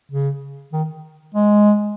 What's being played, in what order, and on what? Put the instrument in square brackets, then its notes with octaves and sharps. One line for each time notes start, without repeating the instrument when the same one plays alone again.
[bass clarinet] C#3
D#3
G#3